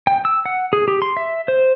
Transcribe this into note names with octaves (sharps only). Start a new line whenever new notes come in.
G5
E6
F#5
G#4
G4
C6
E5
C5